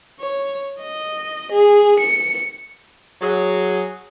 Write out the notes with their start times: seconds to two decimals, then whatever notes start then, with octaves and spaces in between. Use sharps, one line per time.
0.20 C#5
0.82 D#5
1.52 G#4
2.00 C#7
3.21 F#3 G#4